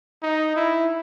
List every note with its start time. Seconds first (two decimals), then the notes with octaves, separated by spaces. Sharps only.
0.23 D#4
0.56 E4